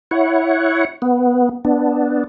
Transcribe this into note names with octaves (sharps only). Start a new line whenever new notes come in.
E4 C#5 F#5
B3
B3 D4